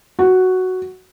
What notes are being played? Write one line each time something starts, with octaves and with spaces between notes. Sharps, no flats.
F#4